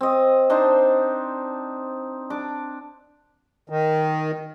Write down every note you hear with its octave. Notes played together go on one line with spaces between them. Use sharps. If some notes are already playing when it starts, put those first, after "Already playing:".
C4 D#5
D4 D#4 C5
D4 D6
D#3